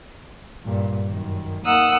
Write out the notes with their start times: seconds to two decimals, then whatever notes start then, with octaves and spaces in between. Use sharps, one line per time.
0.65 G2 A#2
1.08 F#2 D#3
1.65 A#3 D#4 F#5 D#6 E6